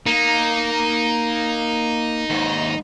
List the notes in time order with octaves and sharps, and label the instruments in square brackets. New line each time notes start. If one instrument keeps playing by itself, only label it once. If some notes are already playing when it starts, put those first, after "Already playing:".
[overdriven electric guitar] A#3 [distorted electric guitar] D#4
[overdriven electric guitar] D#2 G#2